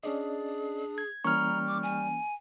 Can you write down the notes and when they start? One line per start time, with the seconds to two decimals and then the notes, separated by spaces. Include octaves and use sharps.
0.03 C#4 D4 G#4 D5 D#5
0.98 G#6
1.24 E3 G3 A#3 C#4 A#5 C#6 F6
1.67 D6
1.83 G#5